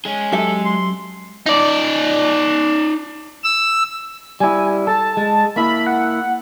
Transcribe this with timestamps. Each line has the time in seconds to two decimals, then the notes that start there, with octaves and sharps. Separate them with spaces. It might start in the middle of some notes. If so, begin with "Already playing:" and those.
0.05 G#3 C#4 G#4
0.32 F#2 G4 A4 E5
0.65 C6
1.46 D#4 D5
3.44 E6
4.40 G3 E4 G#5
4.87 A4 A5
5.17 G#3
5.56 A#3 E4 B5
5.87 F#5